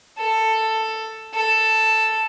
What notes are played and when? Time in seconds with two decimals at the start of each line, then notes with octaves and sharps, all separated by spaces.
0.18 A4
1.35 A4